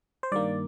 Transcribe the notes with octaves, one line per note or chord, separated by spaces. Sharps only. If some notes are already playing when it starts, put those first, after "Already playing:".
C5
G2 D#3 A#3 D5